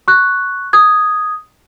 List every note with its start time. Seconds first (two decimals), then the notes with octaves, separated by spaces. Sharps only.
0.08 C#6 F#6
0.73 D#6 G#6